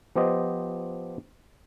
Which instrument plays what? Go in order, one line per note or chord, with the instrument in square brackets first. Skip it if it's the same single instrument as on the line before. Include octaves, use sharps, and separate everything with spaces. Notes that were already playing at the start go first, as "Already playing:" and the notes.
[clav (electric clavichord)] F3 B3 G4 C5 D#5